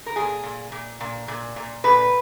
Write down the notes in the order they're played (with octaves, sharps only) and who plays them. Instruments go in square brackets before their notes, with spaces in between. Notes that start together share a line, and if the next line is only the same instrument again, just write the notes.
[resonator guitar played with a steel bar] A#4
A#2 G#4
A#2
A#2
A#2
A#2
A#2
A#2 B4